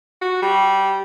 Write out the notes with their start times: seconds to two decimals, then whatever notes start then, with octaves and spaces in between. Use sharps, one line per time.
0.22 F#4
0.42 G3